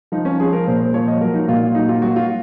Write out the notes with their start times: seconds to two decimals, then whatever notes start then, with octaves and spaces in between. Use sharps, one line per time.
0.12 F3 D#4
0.25 C#4
0.40 F3 G#4
0.53 A#4
0.67 A#2 C5
0.81 C5
0.94 F3 C#5
1.08 D#5
1.21 F#3 A#4
1.34 D#4
1.48 A#2 F4
1.75 F#3 D#4
1.88 F4
2.02 F#3 F#4
2.16 F4